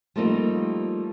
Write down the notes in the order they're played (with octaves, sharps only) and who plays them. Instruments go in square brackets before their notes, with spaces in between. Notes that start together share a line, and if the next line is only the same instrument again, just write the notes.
[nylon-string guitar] F3 G3 A3 A#3 C4 D#4